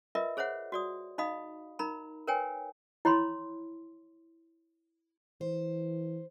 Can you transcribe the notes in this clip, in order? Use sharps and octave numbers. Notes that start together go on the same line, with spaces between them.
F4 A#4 B4 D#5 E5
G#4 C5 C#5 E5 F#5
F#4 D5 D#6
D#4 D#5 F5 B5 D#6
D#4 A#4 A#5 B5
A#4 B4 C#5 G5 G#5
E4 C#5 B5 C6
E3 C5